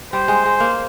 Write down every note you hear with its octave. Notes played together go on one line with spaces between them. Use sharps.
G3 C5
G#3
G#3
A#3